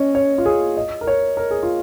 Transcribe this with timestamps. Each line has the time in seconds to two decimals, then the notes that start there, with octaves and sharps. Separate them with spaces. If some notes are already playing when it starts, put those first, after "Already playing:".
Already playing: C#4 C#5 D#5
0.15 C#5
0.38 F4
0.46 G#4
0.77 D#5
1.01 A#4
1.07 C#5
1.37 A#4
1.51 G#4
1.63 F4